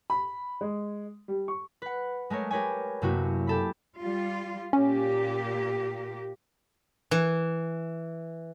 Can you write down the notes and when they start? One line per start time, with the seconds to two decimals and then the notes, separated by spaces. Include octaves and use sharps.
0.10 B5
0.61 G#3
1.28 G3
1.48 C#6
1.82 B4 F#5
2.30 G#3 A3 A#4 C#5
2.51 G4 A#4 B4 C#5 G#5
3.02 F#2 C3 A3 A#3 E4 F#4
3.47 G4 A4 B5
3.99 G3 F4
4.73 A#2 A#3 C#4 G4
7.11 E3